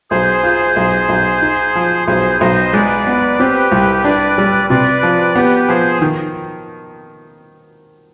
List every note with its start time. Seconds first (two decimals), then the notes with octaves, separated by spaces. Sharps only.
0.10 B1 G#4 C5
0.43 F4
0.76 B1
1.09 B1
1.42 D#4
1.75 F3
2.07 B1 G#4 C5
2.40 B1 C5 D#5
2.73 G#3 B4 D5
3.07 B3
3.39 C4 G4 B4
3.72 C2
4.04 D4 B4 D5
4.38 G3
4.70 C3 B4 D5
5.03 F3
5.35 B3 G4 B4
5.68 F3 G#4 C5
6.02 D#3